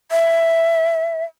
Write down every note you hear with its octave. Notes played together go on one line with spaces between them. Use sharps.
E5